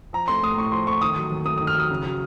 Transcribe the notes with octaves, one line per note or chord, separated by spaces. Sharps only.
F3 A#5
A3 C6
A2 D#6
A2 C#6
F3 C6
A3 C#6
D#3 D#6
F#3
D#2
A3 D#6
D#3 D#6
F6
F#3 D#6
C#3
F#3